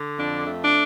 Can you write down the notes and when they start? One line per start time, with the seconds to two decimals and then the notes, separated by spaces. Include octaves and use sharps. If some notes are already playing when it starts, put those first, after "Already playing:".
Already playing: D3
0.19 F2 D4
0.47 A3
0.62 D4